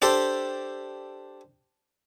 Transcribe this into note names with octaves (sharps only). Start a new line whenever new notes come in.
D4 G4 A4 C5